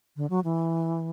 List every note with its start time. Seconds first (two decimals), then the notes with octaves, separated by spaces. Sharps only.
0.16 D3
0.30 F#3
0.44 E3